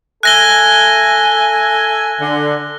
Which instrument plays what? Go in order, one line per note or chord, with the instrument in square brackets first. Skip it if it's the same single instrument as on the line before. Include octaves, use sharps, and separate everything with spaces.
[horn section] A4 E5 G#5 [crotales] F#6 A#6 G7
[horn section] D3